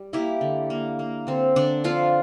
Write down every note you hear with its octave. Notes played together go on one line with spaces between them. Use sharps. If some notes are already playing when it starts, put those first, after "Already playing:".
Already playing: G3
A#3 E4 G4
D3
A#3
A#3
D3 C4
D3 D4
F3 D4 F4